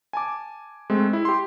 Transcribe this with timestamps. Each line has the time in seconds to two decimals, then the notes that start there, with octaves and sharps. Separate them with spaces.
0.13 G#5 A5 D6
0.90 G#3 A3 C4
1.13 E4
1.25 G4 C6